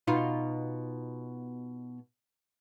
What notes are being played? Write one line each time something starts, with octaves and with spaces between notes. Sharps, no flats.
B2 D#4 F4